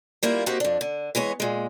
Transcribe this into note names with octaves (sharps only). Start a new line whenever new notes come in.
G3 A#3 E4 F4
A#3 C4 D#4 F#4 G4
F2 D4
D3
E3 G#3 B3 C#5
A#2 G#3